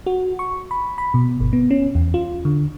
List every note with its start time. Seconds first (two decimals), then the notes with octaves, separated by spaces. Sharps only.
0.06 F#4
0.39 C#6
0.71 B5
0.98 B5
1.14 B2
1.40 G1
1.53 B3
1.71 C#4
1.95 E2
2.14 F4
2.45 D3